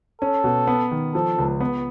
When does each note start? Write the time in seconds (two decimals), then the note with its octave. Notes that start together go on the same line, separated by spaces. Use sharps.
0.22 C#4 A4
0.44 B2
0.67 B3
0.91 D#3
1.14 F3 A4
1.38 C#2
1.60 B3